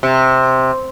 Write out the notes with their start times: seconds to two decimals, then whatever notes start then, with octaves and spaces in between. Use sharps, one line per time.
0.03 C3